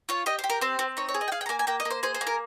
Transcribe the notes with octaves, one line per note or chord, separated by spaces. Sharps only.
F4 C#5
G4 D#5
C5
G4
A#4
C4 C5
C4
D#4 C#5
C#5
G#4
D#5
G5
G#4 F5
G5
A#5
A#3 G#5
G#5
A#3 G5
D#5
A#3
C5
G#4 C5
C5
A#3
A#4